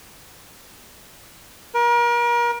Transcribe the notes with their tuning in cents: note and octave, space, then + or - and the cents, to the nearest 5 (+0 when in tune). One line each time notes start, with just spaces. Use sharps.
A#4 +35